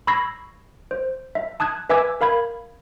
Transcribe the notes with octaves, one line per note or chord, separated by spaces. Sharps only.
B5 C#6 E6 G#6 A#6 C7
C5
E5
A5 D#6 F#6 G#6
B4 E5 G#5 D6 E6 G#6
A#4 F5 B5 G#6